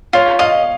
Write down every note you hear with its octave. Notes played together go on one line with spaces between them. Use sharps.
F4 C#5
D#5 F5